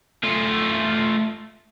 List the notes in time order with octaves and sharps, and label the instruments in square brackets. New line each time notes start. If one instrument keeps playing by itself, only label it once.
[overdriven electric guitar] A3 F4